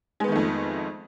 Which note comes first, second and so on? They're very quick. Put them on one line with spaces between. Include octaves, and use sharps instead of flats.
G#3 B3 D#3 A3 F2